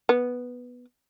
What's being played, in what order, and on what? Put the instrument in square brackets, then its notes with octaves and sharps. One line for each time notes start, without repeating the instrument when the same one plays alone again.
[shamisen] B3